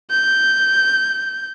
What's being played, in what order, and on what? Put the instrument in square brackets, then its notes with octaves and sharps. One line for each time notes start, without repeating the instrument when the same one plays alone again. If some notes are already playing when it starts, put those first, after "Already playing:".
[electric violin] G6